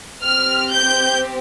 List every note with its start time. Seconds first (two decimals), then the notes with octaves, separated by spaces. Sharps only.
0.22 C4 G4 F6
0.71 G6